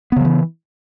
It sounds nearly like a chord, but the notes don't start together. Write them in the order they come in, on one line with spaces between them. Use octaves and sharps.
B3 C#3 F3 E3